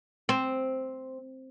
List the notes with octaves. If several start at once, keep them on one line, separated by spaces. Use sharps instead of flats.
C4